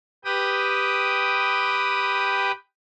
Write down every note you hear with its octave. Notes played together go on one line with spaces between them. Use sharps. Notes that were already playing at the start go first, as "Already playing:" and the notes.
G4 B4 G5 D#6